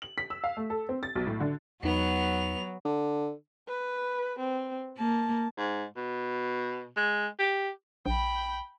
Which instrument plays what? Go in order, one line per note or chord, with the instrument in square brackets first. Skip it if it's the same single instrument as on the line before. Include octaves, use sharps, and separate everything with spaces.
[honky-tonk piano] F#7
B6
E6
F5
A3
A4
C4
A6
B1
A2
D3
[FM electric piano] E2 D#4 [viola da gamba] F#3 [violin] B3 F7
[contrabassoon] D3
[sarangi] B4
C4
[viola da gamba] A#3 [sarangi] A5
[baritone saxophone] G#2
B2
G#3
G4
[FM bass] A#1 [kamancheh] G5 B5